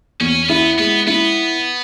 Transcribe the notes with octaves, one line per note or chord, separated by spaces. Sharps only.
E2 C#4
B3 E4
G#3 B3
B3 E4